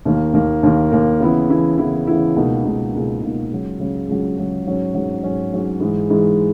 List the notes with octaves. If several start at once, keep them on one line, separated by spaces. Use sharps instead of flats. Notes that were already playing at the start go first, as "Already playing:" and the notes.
D#2 D#3 A#3
D#2 D#3 A#3
D#2 D#3 A#3
D#2 D#3 A#3
C#3 E3 B3 E4
C#3 E3 B3 E4
C#3 E3 B3 E4
C#3 E3 B3 E4
C#2 B2 A#3 D#4
C#2 B2 A#3 D#4
C#2 B2 A#3 D#4
C#2 B2 A#3 D#4
C#2 C#3 F#3
C#2 C#3 F#3
C#2 C#3 F#3
C#2 C#3 F#3
G#2 F#3 C#4
G#2 F#3 C#4
G#2 F#3 C#4
G#2 F#3 C#4
G#2 E3 G#3
G#2 E3 G#3